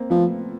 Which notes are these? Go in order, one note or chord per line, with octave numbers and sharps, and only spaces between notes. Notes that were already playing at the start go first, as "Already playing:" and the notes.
Already playing: A#3 C4
F3 A3 B3